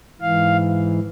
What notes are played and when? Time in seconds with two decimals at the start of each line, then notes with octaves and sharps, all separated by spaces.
0.21 G#2 E3 F5